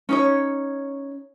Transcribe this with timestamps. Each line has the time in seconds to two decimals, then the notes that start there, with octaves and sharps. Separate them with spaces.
0.09 C#4 D#4 C#5